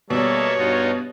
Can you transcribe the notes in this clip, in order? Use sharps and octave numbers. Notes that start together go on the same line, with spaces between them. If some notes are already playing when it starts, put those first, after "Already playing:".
B2 G3 A#3 A4 C#5 E5
G2 D#4 F4 F#4